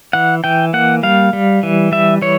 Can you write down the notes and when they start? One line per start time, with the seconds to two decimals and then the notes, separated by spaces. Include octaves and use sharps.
0.13 E3 F#5
0.44 E3 G5
0.74 A#3 F#5
1.03 G3 F5
1.33 G3
1.63 E3
1.92 G3 E5
2.22 E3 C#5